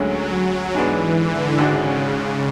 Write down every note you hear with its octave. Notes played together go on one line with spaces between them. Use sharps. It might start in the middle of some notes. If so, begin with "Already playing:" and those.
Already playing: D2 D3 F#3 G#3 C#4
G#2 E3 G#3 B3 D4
D3
G#1 G#2 C#3 G#3 D4 F#4